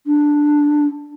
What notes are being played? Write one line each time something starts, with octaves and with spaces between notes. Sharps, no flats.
D4